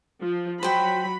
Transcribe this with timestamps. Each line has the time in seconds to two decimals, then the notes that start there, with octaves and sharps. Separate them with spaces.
0.20 F3
0.63 F#3 C5 G5 B5